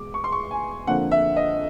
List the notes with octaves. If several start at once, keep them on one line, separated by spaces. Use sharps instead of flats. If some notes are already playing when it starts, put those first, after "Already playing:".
Already playing: E2 B2 G#3 D6
C#6
C6
C#6
G#5
F2 D3 F3 A#3 F#5
E5
D#5